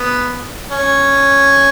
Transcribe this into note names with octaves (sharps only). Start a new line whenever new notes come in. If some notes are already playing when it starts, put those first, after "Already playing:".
Already playing: B3
C#4